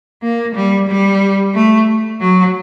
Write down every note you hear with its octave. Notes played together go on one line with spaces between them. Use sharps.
A#3
G3
G3
A3
F#3